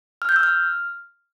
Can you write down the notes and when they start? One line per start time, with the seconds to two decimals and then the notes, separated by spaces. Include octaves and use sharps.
0.22 F6
0.29 G6
0.36 E6
0.43 F6